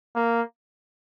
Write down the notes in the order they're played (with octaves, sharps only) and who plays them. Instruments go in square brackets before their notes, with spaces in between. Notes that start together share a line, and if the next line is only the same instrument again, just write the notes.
[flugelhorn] A#3